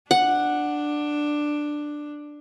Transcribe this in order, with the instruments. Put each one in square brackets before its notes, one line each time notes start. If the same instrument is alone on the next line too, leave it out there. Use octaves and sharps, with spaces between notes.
[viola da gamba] D4 [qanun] F#5